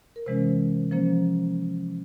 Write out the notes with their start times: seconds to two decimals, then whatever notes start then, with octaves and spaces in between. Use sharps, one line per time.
0.16 A#4
0.26 C3 E3 G#3 C#4 C5
0.91 F3 A#3 C#4 C5